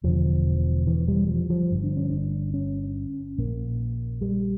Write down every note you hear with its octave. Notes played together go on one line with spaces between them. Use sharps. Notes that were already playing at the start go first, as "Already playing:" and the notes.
E1 E2 D3 F3
E3
G3
F3
F3
G1 G2 D3
D4
C#4
D4
C#4
A#1 A#2 A#3
G3